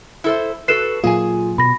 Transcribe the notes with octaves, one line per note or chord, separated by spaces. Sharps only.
E4 A4 C5
F#4 A4 B4 C7 E7
A#2 F#3 A#3 F4 G#4 G#5
B2 B5 A#6